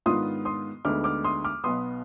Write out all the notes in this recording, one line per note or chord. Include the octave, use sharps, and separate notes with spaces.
G#2 D#3 B3 D4 F4 C6 D#6
C6 D#6
D2 D3 G#3 B3 D#4 D6 F6
D6 F6
C6 D#6
D6 F6
B1 B2 B3 C6 D#6